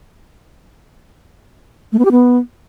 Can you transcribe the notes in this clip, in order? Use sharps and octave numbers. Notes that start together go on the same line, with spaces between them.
A3
B3
G4
B3